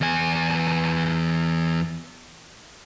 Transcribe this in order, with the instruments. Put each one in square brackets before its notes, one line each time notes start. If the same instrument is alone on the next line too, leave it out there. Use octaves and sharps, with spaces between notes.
[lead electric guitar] E2 G#5